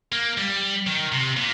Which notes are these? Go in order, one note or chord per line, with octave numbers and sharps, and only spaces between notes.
A#3
G3
D#3
C3
A#2